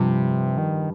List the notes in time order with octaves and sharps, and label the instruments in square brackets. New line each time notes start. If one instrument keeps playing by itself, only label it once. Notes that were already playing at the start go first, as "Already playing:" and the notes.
Already playing: [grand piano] G2 F3 [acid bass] C3
[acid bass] D#3